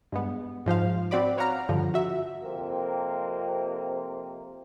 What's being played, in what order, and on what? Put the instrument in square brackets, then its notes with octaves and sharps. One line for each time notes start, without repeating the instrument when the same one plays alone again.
[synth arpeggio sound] G2 G#3 B3
G#2 F3 C5 F5
C4 F#4 D5 B5 D6
B4 C#5 F5 F#5 A#5 F6
G2 D3 F3
F#4 E5
[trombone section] F2 C3 A#3 C4